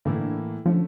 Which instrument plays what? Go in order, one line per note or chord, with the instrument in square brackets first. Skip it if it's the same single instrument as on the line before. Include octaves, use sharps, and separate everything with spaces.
[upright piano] A2 E3 A#3 E4 A4 [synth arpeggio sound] D3
[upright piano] D3 A3 C#4 [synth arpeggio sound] F3